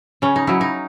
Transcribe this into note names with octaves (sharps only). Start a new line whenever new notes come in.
C#3 C#4
D#4
F#3 C#4 E4
D#4